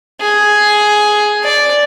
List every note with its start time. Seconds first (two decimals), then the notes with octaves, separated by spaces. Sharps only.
0.21 G#4
1.44 D5